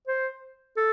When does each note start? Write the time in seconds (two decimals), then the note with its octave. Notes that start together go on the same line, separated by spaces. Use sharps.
0.08 C5
0.77 A4